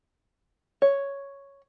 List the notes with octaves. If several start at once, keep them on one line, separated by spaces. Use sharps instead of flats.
C#5